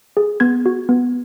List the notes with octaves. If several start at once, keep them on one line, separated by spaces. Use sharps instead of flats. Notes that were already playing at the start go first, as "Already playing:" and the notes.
G#4
B3 G#6
F#4
B3